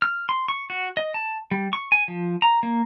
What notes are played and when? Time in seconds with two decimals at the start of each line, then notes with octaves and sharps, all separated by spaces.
0.02 F6
0.29 C6
0.48 C#6
0.70 F#4
0.97 D#5
1.14 A5
1.51 G3
1.73 C#6
1.92 G#5
2.08 F3
2.42 A#5
2.63 A#3